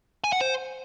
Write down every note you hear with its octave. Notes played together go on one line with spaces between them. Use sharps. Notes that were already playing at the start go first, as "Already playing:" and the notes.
G#5
F#5
C5